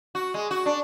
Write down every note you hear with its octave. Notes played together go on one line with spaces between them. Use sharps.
F#4
G#3
F#4
D4